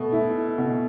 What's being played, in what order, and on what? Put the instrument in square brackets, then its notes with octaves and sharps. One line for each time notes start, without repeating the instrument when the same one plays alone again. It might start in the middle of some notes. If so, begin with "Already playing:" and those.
Already playing: [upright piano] B2 A3
E4
B2